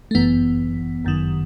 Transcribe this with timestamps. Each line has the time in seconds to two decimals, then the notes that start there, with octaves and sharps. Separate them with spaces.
0.11 A3
0.15 G1 F#2 E3 B3
1.05 G1 F#2 D#3